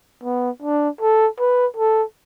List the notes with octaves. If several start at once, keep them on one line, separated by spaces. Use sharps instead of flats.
B3
D4
A4
B4
A4